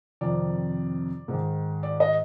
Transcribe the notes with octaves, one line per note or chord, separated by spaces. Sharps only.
F2 C3 D#3 D5
G#2 D#3
D5
D#5